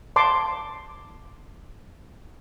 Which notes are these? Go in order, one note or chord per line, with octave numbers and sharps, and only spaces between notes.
A5 C6 D6